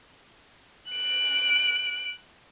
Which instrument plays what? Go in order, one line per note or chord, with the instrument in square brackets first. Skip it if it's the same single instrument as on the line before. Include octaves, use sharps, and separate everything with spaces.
[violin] F#6 D7